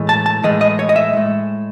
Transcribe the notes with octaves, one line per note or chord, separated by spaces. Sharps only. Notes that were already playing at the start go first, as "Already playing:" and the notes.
Already playing: A2 E3 G#3
A5
A5
A2 E3 G#3 D#5
D#5
C#5
D#5
E5
A2 G#3